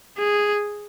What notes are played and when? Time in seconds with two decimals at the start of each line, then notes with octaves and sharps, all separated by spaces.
0.18 G#4